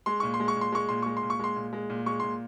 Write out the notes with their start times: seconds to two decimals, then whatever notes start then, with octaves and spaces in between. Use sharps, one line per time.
0.06 G#3 C6
0.20 A#2 C#6
0.34 C6
0.40 G#3
0.48 C#6
0.56 A#2
0.61 C6
0.72 G#3 C#6
0.89 A#2 C6
1.02 G#3 C#6
1.17 C6
1.23 A#2
1.30 C#6
1.39 G#3 C6
1.56 A#2
1.73 G#3
1.90 A#2
2.06 G#3 C#6
2.20 A#2 C6